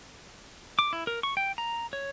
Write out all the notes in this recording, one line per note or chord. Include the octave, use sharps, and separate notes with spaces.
D6
E4
A#4
C#6
G5
A#5
C#5